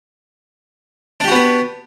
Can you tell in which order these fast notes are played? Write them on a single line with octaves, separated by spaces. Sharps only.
D4 G4 F#4 B3 B4